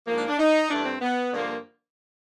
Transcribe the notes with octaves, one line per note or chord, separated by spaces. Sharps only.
G#2 F3 A#3
D4
D4
D#4
G2 E3 A3 D4
C4
B3
G2 D3 F3 A#3